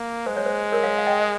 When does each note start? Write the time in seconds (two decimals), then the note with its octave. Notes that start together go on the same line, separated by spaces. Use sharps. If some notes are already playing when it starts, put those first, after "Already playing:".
Already playing: A#3
0.26 G#3 C5
0.36 C#5
0.46 C5
0.72 A#4 C#5
0.84 C#5 F5
0.98 F5
1.07 D#5 G5